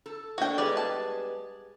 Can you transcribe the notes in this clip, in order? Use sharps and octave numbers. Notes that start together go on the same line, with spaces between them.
A4
A#3 D4 F#4 G5
G3 G#3 B3 D5
A5